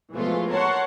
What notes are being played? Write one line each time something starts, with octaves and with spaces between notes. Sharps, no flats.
B2 E3 F3 G#3 A3 F4
A#4 C#5 F#5 A5 C6 C#6